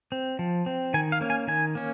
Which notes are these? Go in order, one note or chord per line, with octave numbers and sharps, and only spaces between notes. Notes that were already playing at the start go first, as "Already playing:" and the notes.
C4
F3
C4
D#3 G#5
F5
A#3 C#4
G#5
D#3 G#5
A#3 C#4